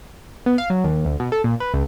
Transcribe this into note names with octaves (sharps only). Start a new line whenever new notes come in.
B3
F5
F#3
D#2
D2
B2
A4
A#2
B4
C#2